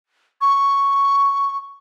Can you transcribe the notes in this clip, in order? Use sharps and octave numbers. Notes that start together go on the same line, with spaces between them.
C#6